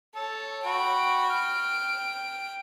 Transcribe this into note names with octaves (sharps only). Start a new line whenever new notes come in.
A4 C#5
F#4 G5 B5 D7
F6